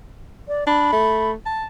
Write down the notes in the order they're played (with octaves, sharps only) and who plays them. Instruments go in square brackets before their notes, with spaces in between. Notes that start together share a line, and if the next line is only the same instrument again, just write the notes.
[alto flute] D5
[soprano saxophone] D4 [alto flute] B5
[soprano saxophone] A3
A5